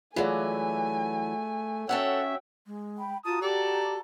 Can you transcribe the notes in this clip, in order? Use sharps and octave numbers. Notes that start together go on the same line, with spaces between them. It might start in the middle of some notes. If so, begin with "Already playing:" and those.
E3 F#3 A3 F4 G#4 D5 G#5
C#4 F#4 A4 C#5 E5 F#5 G5
G#3
G5 B5
F4 F#4 A5 A#5 D#6
G4 A4 D5 A5